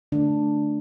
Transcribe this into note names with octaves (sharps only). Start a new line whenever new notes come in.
D3 A3 D4